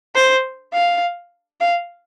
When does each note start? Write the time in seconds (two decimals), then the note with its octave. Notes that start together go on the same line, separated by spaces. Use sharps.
0.15 C5
0.73 F5
1.61 F5